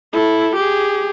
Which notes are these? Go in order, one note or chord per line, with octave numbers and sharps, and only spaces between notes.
E4 A4
G4 G#4